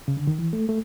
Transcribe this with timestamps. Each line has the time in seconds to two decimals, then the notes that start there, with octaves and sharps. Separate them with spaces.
0.08 C#3
0.17 D3
0.27 D#3
0.39 E3
0.53 A3
0.69 A3